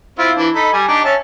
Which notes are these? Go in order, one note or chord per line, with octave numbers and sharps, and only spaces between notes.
C4 E4 F4
E3 D4
D#4 A4 B5
G3 G#5
D4 D#4 G4
C#4 E5 A5